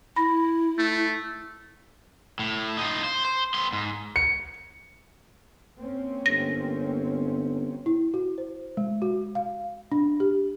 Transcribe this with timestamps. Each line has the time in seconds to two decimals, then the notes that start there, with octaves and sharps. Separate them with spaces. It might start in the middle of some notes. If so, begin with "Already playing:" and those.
0.16 E4 B5 A#6
0.78 A3
2.39 A2
2.77 D#4 F4
3.04 C5
3.25 C5
3.54 B3 C6
3.73 G#2
4.16 C#7
5.76 A#3 C4 C#4
6.26 G1 A#6
7.86 E4
8.14 F#4
8.38 C5
8.77 G#3
9.02 F#4
9.35 F5
9.92 D4
10.20 G4